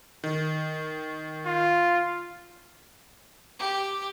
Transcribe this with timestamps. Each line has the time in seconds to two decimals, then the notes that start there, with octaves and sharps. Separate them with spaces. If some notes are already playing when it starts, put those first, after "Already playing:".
0.24 D#3
1.46 F4
3.59 G4